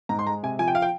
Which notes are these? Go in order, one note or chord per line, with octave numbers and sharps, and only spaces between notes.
G#2 A#5
C6
G#3 A#5
C3 G#5
F3 G#5
G5
F5
G5